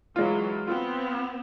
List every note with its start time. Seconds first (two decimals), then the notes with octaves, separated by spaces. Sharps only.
0.16 E3 F#3 G#3 F4
0.67 B3 C4 F4